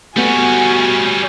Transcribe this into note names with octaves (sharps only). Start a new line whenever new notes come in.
G3 A3 B3 C#4 F#4 G#5